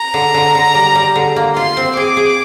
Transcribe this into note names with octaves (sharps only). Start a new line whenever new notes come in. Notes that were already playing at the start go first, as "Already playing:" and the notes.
Already playing: A#5
D3
D3
D3
G3
G3
D3
A#3
F4 C6
C4
G#4 D6
G#4